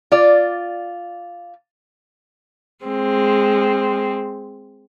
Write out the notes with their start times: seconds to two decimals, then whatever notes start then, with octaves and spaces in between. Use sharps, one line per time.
0.12 F4 D5
2.85 G#3 C4